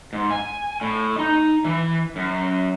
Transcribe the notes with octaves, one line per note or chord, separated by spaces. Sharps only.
G#2
G#5
A2
D#4
E3
F#2